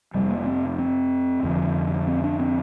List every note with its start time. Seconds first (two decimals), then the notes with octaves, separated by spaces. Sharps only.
0.14 F1 F2 C3 G3
0.30 A#3
0.46 C4
0.79 C4
1.43 F1 F2 D3
2.07 C4
2.24 D4
2.40 C4